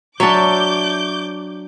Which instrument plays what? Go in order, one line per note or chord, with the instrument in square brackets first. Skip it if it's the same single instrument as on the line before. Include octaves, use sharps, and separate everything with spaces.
[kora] F#3 D4 [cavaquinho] C#5 E5 A5 [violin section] D6 G6